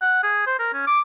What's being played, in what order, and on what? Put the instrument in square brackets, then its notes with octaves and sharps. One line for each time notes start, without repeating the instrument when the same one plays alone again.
[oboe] F#5
G#4
C5
A#4
C#4
D6